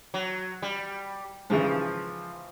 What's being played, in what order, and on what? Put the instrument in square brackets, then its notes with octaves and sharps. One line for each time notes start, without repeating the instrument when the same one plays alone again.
[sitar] F#3
G3
[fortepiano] G#2 C#3 E3 [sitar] F3